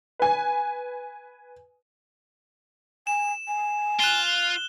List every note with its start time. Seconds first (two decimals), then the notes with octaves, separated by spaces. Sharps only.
0.20 B4 G#5
3.07 G#5 E7
3.48 G#5
4.00 F4 F#6 E7 G7